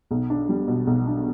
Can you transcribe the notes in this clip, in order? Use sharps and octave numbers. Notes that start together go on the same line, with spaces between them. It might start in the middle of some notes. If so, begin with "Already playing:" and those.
B1
D4
G3
B2
B1
D4